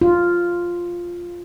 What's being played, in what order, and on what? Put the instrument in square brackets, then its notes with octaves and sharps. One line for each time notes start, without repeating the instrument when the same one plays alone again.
[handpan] F4